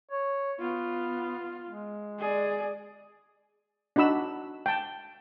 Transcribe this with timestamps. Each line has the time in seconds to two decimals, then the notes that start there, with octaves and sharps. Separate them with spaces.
0.11 C#5
0.60 B3 F4
1.68 G#3
2.19 G#4 D5
3.96 D4 D#4 F#4 B5 E6
4.66 G5 A5